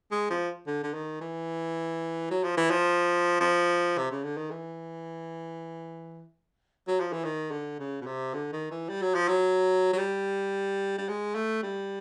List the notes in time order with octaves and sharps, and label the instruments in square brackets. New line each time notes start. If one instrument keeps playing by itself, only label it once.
[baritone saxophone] G#3
F3
D3
D3
D#3
E3
F#3
F3
E3
F3
F3
C3
C#3
D3
D#3
E3
F#3
F3
E3
D#3
D3
C#3
B2
C3
D3
D#3
E3
G3
F#3
F3
F#3
F#3
G3
G3
G#3
A3
G3